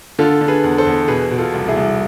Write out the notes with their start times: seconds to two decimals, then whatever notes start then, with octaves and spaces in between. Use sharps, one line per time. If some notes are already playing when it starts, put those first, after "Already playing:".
0.19 D3 F4 A4
0.41 D3
0.48 G#4 B4
0.64 E2
0.78 A4 C5
0.86 E2
1.08 B2 G#4 B4
1.31 B2
1.38 F4 A4
1.54 C2
1.68 E4 G#4
1.76 C2